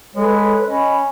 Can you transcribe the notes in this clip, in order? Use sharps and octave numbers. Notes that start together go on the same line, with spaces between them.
G#3 A4 B4 C#5
C#4 D#5 B5